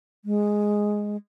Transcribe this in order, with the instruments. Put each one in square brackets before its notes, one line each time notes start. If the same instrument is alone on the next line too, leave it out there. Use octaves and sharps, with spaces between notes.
[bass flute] G#3